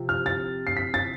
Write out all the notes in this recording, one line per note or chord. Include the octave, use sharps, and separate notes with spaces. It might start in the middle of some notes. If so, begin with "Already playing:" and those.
Already playing: C3 F3
F6
A6
C7
B6
A6